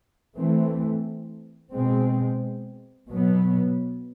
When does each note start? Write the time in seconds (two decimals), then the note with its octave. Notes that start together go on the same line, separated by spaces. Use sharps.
0.37 E3 A3 C4
1.73 B2 G#3 C4
3.09 B2 F#3 B3